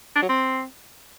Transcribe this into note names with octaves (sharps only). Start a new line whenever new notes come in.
D4
F#3
C4